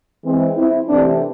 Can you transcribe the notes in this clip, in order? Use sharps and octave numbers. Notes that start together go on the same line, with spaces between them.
E3 G#3 C4
C4 E4
C3 E3 A3 C4 D4